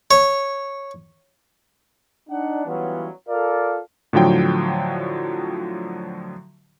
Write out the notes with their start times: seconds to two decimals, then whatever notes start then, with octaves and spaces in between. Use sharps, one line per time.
0.11 C#5
2.29 D4 D#4 F#5
2.67 E3 F#3 G3 B3 C#4 F4
3.29 F4 A4 A#4 D5 F5
4.13 A2 D3 F3 F#3 G5